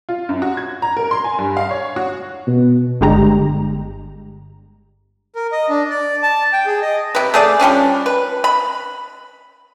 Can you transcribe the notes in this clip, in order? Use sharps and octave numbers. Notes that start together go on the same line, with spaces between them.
F4
F#2
F#4
G#6
A#5
A#4
C6
G#5
G2
F5
C#5
F#4
B2
G1 D3 G#3 G4 A#5
A#4
D#5
D4
D5
A5
G5
G#4
D#5
C3 B4
A3 G#4 D5
F3 G3 C#4 D4
B4
B5